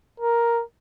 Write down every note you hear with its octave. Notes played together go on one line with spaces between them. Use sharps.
A#4